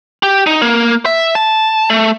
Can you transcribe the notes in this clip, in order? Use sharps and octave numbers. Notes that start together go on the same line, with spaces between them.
G4
D#4
A#3
E5
A5
A3